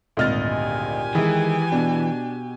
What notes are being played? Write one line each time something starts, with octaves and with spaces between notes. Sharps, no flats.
G#1 D2 A#2 D#5 F6 A6
G4 G#5
D#3 E3 G#3 E4 G#4
B2 D4